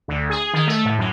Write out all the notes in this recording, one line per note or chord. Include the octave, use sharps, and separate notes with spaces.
D2
G#4
D#3
A3
A2
F#2